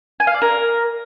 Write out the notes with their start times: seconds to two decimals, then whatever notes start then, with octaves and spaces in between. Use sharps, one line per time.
0.20 G#5
0.27 F5
0.34 D5
0.42 A#4